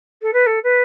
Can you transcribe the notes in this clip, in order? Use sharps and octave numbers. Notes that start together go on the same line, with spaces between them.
A4
B4
A4
B4